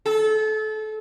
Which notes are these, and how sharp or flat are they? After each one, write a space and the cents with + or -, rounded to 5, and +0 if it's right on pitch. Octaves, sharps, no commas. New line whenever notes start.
A4 -30